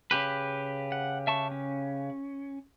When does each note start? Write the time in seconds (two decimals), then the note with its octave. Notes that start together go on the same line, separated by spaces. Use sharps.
0.11 C#3 G4 B4
0.92 F#5
1.27 E5 A5 C#6
1.51 C#4